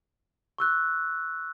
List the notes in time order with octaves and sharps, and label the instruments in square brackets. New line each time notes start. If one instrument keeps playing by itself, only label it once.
[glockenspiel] C#6 E6 F#6